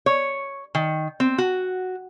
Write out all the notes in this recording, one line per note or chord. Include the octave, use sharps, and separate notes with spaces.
C#5
D#3
C4
F#4